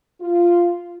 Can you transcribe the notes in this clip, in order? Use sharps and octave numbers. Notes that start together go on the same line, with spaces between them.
F4